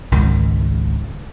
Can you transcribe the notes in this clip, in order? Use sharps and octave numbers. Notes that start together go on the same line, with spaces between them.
G#1 C#2 G#2 D#3